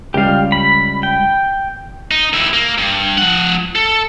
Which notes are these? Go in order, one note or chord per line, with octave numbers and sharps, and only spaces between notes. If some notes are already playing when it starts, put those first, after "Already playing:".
C#2 G3 G4 F5
B5
G5
D#4
D#2 E4
A#3
G2
F3 F#5
A4